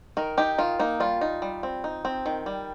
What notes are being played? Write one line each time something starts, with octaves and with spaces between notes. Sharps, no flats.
D#3 A#4
D#4 G4
D#3 F4
A#3 D#4
G3 F4
D#4
G3
C4
D#4
C4
D#3
G3